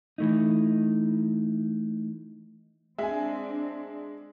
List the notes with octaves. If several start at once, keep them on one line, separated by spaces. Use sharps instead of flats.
E3 A3 D#4
G#3 C4 D4 E5 G#5